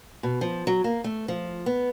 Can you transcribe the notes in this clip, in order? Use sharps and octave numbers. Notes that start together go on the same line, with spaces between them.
B2
F3
F#3
A#3
A3
F3
B3